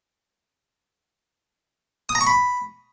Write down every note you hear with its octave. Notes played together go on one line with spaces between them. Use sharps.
D#6
A#5
C#6
B5